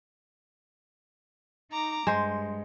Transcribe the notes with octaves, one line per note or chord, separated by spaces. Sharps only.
D#4 A#5 D6
G2 G#3 C5